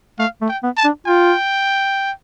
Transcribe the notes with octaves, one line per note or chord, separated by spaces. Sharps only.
A3 F5
A3
G5
B3
A5
D4
F4 G5